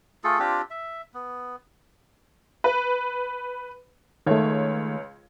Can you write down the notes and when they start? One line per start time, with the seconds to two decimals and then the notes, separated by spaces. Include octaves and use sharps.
0.24 A3 F4 G#4 A4
0.39 C4 D4 F4 G4
0.71 E5
1.14 B3
2.64 B4
4.26 C#2 D#3 A3 C#5